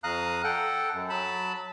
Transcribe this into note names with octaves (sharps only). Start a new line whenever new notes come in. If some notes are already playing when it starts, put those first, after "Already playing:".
F2 F5 A#5 D#6 F#6
A4 F#5 G5
F#2
F#3 A5 B5